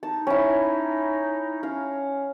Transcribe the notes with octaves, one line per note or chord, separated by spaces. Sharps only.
D#4 A5
C#4 E4
C#4 F5